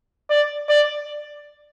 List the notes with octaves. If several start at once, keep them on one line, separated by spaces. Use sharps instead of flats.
D5
D5